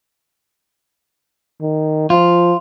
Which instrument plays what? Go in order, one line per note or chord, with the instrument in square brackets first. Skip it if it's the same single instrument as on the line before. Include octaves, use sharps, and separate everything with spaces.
[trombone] D#3
[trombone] F3 [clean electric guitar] F4